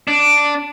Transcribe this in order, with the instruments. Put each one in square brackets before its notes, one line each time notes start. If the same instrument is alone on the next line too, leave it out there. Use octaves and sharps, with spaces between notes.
[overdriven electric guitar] D4